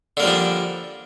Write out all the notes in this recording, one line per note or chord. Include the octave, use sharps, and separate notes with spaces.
D3 F3 G3 A#3 D4